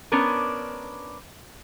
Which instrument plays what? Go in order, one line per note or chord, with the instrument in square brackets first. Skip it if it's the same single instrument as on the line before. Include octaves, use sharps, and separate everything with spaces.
[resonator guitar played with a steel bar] B3 C#4 D4 A#4